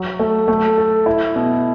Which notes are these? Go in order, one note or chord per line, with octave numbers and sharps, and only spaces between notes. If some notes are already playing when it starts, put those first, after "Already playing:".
Already playing: F#3
A3
A3
A4
E4
B2